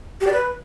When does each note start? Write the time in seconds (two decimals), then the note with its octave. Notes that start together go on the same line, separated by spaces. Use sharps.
0.21 G4
0.27 D5
0.33 B4